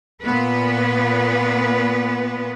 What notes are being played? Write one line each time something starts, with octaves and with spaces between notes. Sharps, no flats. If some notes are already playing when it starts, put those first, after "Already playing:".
A#2 B3 B4